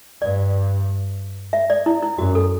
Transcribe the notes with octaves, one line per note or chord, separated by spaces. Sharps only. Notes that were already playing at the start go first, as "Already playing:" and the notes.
G2 D5
E5
D5
E4
E4
F#2 F#4
A4